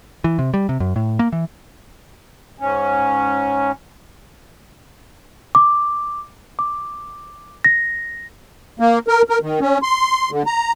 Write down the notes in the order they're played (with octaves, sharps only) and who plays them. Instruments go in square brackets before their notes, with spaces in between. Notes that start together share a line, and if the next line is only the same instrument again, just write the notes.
[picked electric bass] E3
C3
G3
C3
F#2
A2
A#3
E3
[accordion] G#2 C#4
[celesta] D6
D6
A#6
[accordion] A#3
A#4
A#4
D#3
C#4
C6
D3
A#5